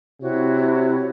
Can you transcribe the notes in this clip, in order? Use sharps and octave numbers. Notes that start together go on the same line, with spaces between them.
C3 E4 F#4 C#5